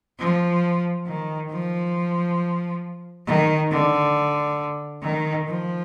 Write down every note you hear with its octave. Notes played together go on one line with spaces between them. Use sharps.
F3
D#3
F3
D#3
D3
D#3
F3